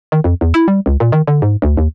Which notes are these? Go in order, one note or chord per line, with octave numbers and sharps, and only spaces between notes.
D#3
F2
E2
E4
G3
C#2
A#2
D#3
D3
G#2
D2
D#2